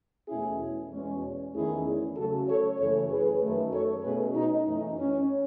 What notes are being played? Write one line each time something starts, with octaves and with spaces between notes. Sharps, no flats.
E2 B2 A3 C#4 E4 G#4
E2 B2 G#3 C#4
E2 D#3 A3 C#4 E4 G#4
C#3 F#3 A3 C#4 F#4 A4
A4 C#5
F#2 C#3 E3 A3 A4 C#5
G#4 B4
F#2 D#3 A3
A4 C#5
B2 A3 C#4 G#4 B4
D#4
F#2 E3 A3 C#4 D#4
C#4